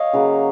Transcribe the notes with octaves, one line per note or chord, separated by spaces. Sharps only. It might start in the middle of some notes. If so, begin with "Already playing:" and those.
Already playing: C#5 D#5 F5
C#3 F#3 A#3